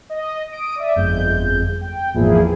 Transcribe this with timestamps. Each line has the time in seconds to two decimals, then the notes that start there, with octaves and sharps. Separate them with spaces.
0.10 D#5
0.52 D#6 D7
0.76 D5 E5
0.96 G1 F2 G#3 G6
1.81 G5
2.14 G#1 E2 A#2 F3 E4 G#4